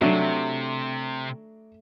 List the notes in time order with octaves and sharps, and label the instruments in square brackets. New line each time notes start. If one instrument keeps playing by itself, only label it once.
[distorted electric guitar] C3 [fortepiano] F#3 D4 [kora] A3